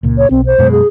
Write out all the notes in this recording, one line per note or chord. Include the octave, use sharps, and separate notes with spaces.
C#2 A#2
C#5
B1 C4
C5
F#2 B2 G#3
G#4